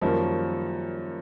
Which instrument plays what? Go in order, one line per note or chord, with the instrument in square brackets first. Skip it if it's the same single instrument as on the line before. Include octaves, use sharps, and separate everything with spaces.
[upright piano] F#2 D#3 G3 A#3 C#4 [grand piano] F3